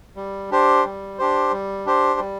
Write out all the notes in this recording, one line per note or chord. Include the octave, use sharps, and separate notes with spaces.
G3
D4 G4 C5
G3
D4 G4 C5
G3
D4 G4 C5
G3